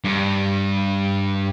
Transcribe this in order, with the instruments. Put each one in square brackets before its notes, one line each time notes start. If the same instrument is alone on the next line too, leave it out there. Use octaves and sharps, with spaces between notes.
[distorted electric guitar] G2